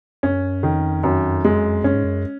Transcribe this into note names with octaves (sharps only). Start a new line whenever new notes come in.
F#2 C#4
F2 D#3
F#2
G#3
F#2 C#4
G#2
F#2